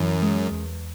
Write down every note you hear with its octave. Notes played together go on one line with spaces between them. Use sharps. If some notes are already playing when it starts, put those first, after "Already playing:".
Already playing: F#2 E3
G#3
E2